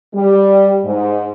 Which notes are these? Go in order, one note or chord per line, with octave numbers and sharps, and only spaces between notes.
G3
G#2